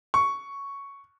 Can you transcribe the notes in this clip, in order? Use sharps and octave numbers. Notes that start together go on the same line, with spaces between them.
C#6